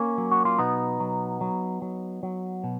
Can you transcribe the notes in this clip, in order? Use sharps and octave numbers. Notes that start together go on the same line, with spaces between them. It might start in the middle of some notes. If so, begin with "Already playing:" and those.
Already playing: A#3 C#4
F#3
F#4
F4
B2 B3 D#4
F#3
F#3
F#3
F#3
B2